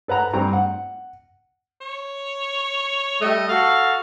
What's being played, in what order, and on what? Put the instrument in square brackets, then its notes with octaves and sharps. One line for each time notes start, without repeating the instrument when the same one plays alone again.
[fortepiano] A4 B4 F#5 A#5
G2 C4 A#5
F#5
[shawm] C#5
[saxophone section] G3 A3 [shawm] D#5
[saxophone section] F#4 A4 [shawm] F5